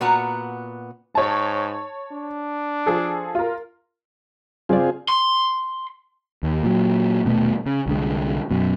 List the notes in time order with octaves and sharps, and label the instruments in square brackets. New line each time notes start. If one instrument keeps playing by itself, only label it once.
[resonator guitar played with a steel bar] A#2 B3 F#4 F#5 A#5
[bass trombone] G#2 [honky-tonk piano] C#5 A5
[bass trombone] D4
[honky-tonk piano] F3 G#4 A4
F4 A#4
[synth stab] G2 C#3 D5 [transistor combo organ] C4 F4 G#4
[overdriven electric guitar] C6
[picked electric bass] D#2
A#2 F#3
D#1 B2 A3 B3
C#3
C2 D3 G#3
F#2 B2